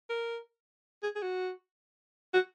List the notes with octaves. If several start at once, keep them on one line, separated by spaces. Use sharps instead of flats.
A#4
G#4
G#4
F#4
F#4